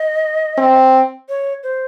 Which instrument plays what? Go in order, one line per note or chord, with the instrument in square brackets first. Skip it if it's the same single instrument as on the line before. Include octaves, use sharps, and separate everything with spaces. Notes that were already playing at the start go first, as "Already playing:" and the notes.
Already playing: [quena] D#5
[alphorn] C4
[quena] C#5
C5